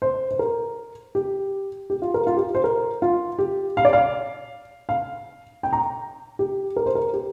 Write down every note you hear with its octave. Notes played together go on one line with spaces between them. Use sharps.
C5
C5
A#4
G4
G4
F4
A#4
F4
G4
C5
A#4
F4
G4
F5
D5
F5
F5
G5
A#5
G4
A#4
C5
A#4
G4